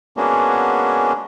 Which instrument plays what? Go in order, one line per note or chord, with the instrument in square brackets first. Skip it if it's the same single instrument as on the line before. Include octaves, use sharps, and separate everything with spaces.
[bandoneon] G#3 A#3 B3 C#4 D4 F#4